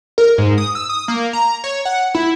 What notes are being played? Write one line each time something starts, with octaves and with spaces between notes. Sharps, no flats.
A#4
G#2
D#6
E6
D#6
A#3
A#5
C#5
F#5
E4